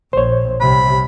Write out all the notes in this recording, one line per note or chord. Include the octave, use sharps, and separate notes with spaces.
A#1 C5 C#5
C2 C3 B5